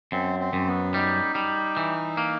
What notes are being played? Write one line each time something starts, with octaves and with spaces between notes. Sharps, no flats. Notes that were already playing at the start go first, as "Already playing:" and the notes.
F#2 C4
C4
F#2
B3
G3 D#4
G3
E3
A#3